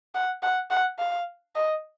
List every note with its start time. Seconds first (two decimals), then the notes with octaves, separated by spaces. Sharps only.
0.15 F#5
0.43 F#5
0.71 F#5
0.99 F5
1.55 D#5